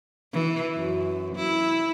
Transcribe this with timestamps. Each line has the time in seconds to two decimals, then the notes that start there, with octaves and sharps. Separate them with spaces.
0.33 E3
0.75 F#2
1.35 E4